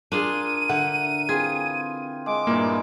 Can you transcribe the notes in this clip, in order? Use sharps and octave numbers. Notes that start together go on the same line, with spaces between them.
D4 F4 G#4 A#4 D#7
D3 E5 F#5
E3 C4 F4 G#4 G#6
G#3 D6
G2 A#2 A#3 E4